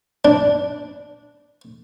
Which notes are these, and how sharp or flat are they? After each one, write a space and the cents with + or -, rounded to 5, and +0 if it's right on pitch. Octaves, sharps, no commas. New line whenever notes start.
D4 -5